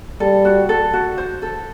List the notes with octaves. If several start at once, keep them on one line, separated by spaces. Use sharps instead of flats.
G3 A4
F#4
A4
F#4
C5
A4